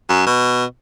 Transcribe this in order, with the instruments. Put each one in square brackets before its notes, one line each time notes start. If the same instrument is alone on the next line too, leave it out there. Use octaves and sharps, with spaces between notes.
[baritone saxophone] F#2
B2